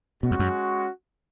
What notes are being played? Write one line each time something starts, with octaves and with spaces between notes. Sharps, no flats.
B2 G#3 C#4 F#4
F2
F#2